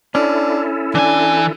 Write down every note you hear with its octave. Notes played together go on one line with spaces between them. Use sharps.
C#4 D4 E4 A4
E3 D4 G#5